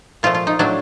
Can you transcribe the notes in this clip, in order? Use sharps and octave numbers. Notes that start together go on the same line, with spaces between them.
A#2 F3 A3 F4
F4
D#4
A2 F#3 A3 D4